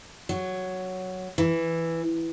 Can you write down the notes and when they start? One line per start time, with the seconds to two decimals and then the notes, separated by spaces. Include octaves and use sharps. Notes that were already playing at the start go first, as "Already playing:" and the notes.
0.29 F#3
1.38 E3